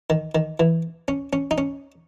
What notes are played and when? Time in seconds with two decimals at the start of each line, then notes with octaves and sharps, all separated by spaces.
0.10 D#3
0.35 D#3
0.60 E3
1.08 C#4
1.33 C#4
1.51 D#4
1.58 C#4